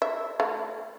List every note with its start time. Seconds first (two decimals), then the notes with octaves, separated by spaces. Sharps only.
0.02 E5
0.40 A3